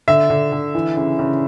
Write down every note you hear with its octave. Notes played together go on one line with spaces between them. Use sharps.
D3 E5
D3
D3
E3
C#3
C#3